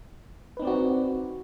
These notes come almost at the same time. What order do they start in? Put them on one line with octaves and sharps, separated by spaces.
B4 D#4 C4 D5 F#4